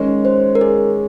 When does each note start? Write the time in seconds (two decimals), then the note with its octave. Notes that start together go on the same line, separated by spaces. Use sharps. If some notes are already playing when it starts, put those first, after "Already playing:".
Already playing: D#3 G#3 C#4
0.25 C5
0.55 A#4
0.61 G#4